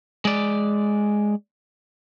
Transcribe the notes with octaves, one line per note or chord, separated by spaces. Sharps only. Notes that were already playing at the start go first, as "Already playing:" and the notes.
G#3 D5